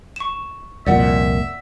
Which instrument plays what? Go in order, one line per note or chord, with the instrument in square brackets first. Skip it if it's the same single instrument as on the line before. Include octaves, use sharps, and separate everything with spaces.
[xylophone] C#6 E7
[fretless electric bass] C2 F2 A#2 [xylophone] D5 F#5 [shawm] E5